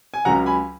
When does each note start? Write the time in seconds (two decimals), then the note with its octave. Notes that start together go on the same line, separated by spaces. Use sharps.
0.14 G#5
0.25 C#2 C#3 F#3 F#5 A#5
0.46 G#5 B5